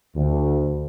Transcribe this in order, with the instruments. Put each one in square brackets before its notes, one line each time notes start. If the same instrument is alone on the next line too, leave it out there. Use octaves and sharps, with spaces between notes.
[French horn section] D2